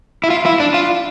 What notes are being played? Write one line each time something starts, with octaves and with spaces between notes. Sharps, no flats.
E4
F4
E4
D4
F4